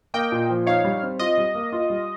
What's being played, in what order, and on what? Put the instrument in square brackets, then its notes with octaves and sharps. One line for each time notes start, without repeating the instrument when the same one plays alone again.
[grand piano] A#3 [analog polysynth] D#5 G5
[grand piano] A#2
F3
[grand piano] D#4 [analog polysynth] C#5 F5
[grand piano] G3
C4
[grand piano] F4 [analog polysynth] D#5
[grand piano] G3
A#3
F4
G3